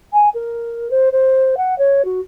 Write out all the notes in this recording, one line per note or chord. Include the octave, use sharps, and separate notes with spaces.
G#5
A#4
C5
C5
F#5
C#5
F#4